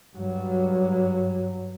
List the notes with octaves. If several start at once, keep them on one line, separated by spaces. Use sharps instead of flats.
G2 F#3